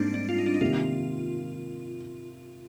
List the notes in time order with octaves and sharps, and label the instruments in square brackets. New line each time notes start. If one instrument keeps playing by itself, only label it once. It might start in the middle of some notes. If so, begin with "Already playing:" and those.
Already playing: [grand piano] G#2 [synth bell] G3 A#3 C4 D4 D#4
[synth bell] D4
F4
D#4
D4
D#4
[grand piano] C3 D#3 A#3 [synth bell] F4